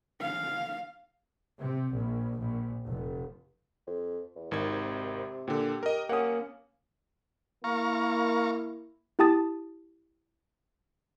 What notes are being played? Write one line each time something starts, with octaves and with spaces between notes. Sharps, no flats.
F5
C3
A#1
A#1
F1
F2
E2
G#1 C3 D#3 G#6
A#2 D3 G4
A#4 D#5
A#3 C#4 F#5 D#6
A#3 E4 F5 A#5 C#6
E4 G4 G5 A5 D#6 A6